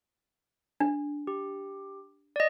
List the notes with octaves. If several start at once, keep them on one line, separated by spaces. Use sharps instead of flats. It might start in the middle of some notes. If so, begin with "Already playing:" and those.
D4
G4
D5 D#5